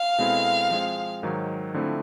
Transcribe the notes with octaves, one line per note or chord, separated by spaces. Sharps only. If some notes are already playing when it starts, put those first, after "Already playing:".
Already playing: F5
B2 G#3 C4 E4 A4
F3 G#3 C4
G#2 D#3 F#3
D3 F3 A3 C4 E4